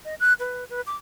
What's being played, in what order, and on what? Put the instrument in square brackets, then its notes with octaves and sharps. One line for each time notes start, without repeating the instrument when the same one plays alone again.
[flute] D#5
F#6
B4
B4
D6